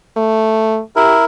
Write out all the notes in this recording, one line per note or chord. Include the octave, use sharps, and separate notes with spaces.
A3
E4 G4 A#4